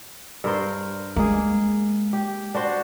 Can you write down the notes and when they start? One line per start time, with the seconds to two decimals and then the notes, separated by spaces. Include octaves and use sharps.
0.44 G2 A#4 C5
1.16 G#3 A#3 G#4
2.13 G4
2.55 D4 F#4 C5